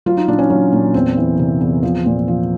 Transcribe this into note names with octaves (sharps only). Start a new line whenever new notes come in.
F#3 F4
D#4
A#2 D4
C#4
F#3
A#2
E2 C4
E3
C3
E2
F3
A#2
F3